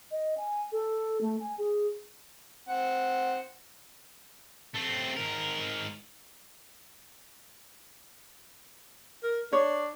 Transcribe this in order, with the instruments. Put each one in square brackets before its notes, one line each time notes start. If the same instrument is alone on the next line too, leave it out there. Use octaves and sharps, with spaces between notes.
[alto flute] D#5
G#5
A4
A3
G#5
G#4
[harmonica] C4 F#5
[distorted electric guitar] A3 C4
G#2 A#4
[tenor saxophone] A#4
[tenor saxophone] D4 [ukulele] C#5